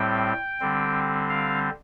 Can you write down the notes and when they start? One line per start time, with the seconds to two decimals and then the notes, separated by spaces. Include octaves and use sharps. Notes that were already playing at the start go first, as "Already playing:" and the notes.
Already playing: A2 G3 C4 G5
0.60 D3 G3 C4
1.29 F5